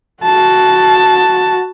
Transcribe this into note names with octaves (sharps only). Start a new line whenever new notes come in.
F#4 A5